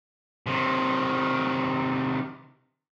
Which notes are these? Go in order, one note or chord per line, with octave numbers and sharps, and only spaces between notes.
C3 D#3